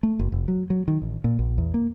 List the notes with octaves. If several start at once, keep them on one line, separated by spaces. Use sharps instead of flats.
A3
F#1
F1
F#3
F#3
D#3
A1
A#2
A#1
E2
A#3